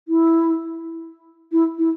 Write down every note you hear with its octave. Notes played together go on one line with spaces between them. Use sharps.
E4
E4
E4